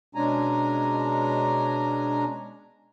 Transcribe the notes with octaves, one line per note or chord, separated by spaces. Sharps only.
B2 G#3 C#4 D4 G#5 A#5